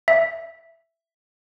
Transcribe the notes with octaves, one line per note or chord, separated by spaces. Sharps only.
E5